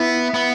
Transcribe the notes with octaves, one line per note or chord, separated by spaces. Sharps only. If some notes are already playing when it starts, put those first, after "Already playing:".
Already playing: B3 E4
B3